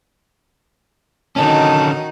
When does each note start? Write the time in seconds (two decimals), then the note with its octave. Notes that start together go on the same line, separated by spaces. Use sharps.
1.36 D3 D#3 C#4 D#4 F#4 A5